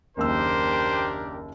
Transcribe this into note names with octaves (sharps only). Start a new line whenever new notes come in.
F#1 D#2 D4 G4 A#4 C5 E6